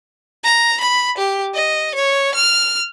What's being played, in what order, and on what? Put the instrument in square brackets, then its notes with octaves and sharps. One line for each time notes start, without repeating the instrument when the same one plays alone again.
[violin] A#5
B5
G4
D#5
C#5
F6